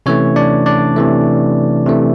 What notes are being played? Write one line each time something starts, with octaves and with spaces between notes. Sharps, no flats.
C3 E3 A3 C#4 C#5
D4 D5
D4 D5
C3 E3 A3
C3 E3 A3